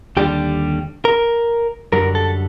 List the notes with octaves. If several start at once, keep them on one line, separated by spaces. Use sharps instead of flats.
D#2 D3 G3 D4 G4
A#4
F#2 D3 G3 A#4
A4